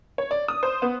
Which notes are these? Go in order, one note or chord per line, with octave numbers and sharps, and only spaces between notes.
C#5
D5
D#6
C5
B3